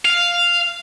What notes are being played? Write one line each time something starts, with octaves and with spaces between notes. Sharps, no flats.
F5